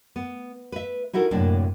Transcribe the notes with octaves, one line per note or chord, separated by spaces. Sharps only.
B3
B4 E5
D#4 E4 F#4 A4 A#4
F#2 A2 C3 A#3 D4 E4